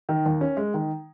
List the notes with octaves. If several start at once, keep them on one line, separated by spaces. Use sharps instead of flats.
D#3
D#2
C#4
G#3
D#3